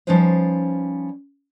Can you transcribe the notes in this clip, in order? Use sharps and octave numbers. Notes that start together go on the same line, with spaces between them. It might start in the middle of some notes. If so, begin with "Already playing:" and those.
F3 G3 C#4 D#4 B4 C5